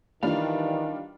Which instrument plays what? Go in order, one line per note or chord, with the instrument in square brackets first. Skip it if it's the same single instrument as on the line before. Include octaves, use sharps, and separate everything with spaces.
[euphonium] D#3 [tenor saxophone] E3 [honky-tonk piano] G3 D4 F4 [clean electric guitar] F5